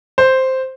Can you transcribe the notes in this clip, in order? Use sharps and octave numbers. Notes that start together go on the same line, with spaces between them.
C5